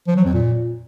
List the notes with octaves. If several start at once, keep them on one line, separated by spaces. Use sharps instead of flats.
F3
F#3
F2
A#2